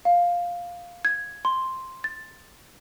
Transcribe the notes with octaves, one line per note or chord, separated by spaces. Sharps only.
F5
G#6
C6
A6